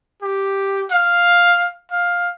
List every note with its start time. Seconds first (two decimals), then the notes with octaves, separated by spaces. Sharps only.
0.22 G4
0.91 F5
1.91 F5